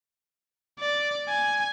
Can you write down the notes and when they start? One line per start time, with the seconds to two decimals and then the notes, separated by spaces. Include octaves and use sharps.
0.80 D5
1.28 G#5